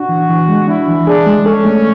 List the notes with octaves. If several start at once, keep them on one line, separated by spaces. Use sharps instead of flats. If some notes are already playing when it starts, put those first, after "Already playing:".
Already playing: D4 F#4
E3
E3
G#3
D4 E4
E3
D4 G#4
G#3
C#4 A4
A3